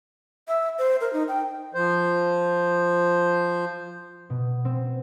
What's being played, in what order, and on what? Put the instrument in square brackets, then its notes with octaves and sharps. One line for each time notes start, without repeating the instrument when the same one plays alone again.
[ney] E5
C5
A#4
D#4
G5
[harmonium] F3 C5
[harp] B2
C4